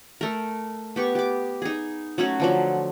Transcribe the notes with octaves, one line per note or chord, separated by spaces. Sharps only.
A3 A#4
B3 G4 C#6
G4 D6
D#4 G#4
F#3 A3 C#4 F#4
D3 F3 F#3